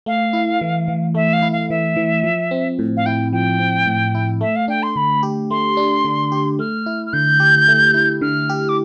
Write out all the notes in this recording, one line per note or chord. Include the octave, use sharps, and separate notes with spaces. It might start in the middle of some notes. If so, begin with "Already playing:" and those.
A3 F5
E4
E3
E3
A3 E5
F5
E4
F5
E3 E5
E3
F3
C4
A2
F5
E4 G5
F3 G5
C4
A2
E4
A3 E5
F5
D4 G5
C6
D3 B5
G4
A3 C6
D4
D3
G4
A3 F6
E4
F6
D3 G6
G4
A3
E4
D3 F6
G4
D6